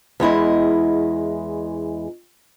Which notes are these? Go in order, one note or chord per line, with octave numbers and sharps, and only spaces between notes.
E2 G#3 E4 D#5